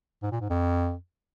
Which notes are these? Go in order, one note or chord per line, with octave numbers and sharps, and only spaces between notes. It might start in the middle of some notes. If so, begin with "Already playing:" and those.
G#2
A#2
G#2
F2